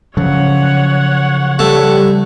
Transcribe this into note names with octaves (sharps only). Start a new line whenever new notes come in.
C#3 F3 F#3 C#5 F#5
G3 A3